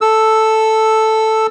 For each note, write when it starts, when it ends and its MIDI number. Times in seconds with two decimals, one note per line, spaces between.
0.01 1.47 69
0.01 1.47 88